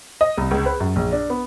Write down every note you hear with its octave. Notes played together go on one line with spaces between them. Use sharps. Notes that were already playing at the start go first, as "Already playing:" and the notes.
D#5
C2
C#2
B4
F#2
A#1
D4
B3